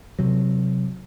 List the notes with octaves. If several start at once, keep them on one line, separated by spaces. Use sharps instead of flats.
C3 F#3